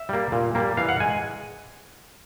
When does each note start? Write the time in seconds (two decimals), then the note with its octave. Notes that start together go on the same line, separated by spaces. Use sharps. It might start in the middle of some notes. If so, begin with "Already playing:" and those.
Already playing: E5
0.09 G3 A#3
0.32 A#2
0.55 G3 A#3
0.77 E3 F5
0.89 F#5
1.00 G#3 G#5